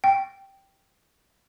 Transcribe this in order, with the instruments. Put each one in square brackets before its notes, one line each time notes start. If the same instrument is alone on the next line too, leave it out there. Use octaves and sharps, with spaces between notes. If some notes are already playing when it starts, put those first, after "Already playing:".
[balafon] G5